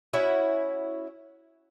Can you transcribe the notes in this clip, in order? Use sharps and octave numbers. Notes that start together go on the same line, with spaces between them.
C#4 E4 F#4 E5